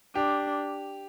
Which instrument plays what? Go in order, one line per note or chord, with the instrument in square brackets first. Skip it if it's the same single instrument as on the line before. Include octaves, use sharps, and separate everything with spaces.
[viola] D4 [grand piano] G4